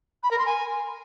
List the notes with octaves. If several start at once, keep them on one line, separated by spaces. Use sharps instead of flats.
B5
A#4
C6
G#5